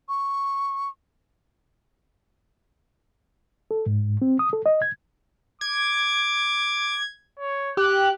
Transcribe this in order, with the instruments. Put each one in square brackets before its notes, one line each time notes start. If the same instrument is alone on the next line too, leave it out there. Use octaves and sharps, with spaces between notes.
[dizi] C#6
[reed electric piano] A4
G#2
C4
D#6
A4
D#5
G#6
[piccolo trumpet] D6 [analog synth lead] G#6
[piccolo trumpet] C#5
[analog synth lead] G4 [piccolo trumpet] F#6